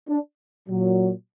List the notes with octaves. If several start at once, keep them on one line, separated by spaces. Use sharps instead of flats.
D4
A#2 F#3